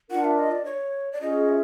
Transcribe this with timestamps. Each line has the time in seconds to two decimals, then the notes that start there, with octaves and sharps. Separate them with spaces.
0.11 D4 F4 A#4 F#5
0.25 E5
0.38 D#5
0.52 D5
0.65 C#5
1.12 D5
1.21 C#4 F4 G#4 D#5
1.49 E5